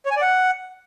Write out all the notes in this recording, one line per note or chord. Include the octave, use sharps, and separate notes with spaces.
C#5
G#5
D5
F#5